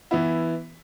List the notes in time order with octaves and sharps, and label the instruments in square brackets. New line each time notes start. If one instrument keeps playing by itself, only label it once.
[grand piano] E3 B3 E4